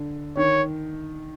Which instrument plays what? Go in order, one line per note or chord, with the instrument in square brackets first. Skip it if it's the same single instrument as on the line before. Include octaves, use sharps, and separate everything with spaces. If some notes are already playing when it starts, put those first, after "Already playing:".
Already playing: [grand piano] D3
[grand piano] D#3 [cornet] C#5